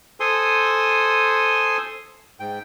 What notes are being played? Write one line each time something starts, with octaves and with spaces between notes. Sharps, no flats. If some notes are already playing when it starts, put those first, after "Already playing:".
A4 C5 G#5 C6 D#6
G#2 G5